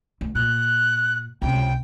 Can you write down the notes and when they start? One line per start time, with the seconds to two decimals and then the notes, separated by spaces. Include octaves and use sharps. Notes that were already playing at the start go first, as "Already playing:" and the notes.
0.21 D2
0.35 A#2 F#6
1.42 C#2 C3 G5